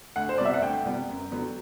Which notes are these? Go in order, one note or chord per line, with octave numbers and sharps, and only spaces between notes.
D2 F#5
C5
C3 G3 B3 D5
E5
F#5
D2 G5
C3 G3 B3
F#2
D3 F#3 B3